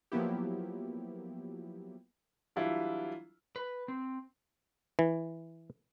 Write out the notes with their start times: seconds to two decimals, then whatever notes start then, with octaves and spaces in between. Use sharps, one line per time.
0.12 F3 F#3 A#3 B3 E4 G4
2.56 E3 F#3 G3 D4 E4 F4
3.56 B4
3.88 C4
4.99 E3